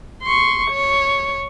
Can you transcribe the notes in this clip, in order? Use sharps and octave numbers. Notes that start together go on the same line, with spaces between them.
C6 C#6
C#5